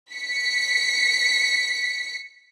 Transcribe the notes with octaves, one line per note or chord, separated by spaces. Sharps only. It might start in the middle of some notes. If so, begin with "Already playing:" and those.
B6 C#7